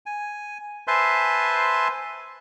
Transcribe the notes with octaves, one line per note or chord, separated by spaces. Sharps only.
G#5
B4 C5 E5 G#5 A5 C6